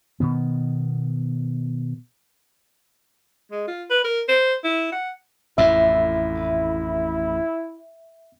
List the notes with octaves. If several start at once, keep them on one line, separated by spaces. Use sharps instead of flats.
B2 D#3 B3
G#3
F4
B4
A#4
C5
E4
F#5
A1 F2 A2 E4 E5